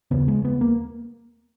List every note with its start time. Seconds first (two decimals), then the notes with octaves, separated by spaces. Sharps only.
0.11 D#2 C#3 B3
0.28 G#3
0.45 B3
0.61 A#3